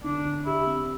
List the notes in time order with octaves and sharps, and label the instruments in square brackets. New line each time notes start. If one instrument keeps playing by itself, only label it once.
[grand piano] D3 [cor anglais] D4
[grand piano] D3
[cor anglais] E4 [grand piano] G4
[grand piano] C4